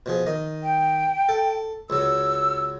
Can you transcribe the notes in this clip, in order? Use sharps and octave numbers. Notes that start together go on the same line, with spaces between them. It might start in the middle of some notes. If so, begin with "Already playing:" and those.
B2 F3 G#4
D#3 D#5
G5
A4
C#2 F#3 E6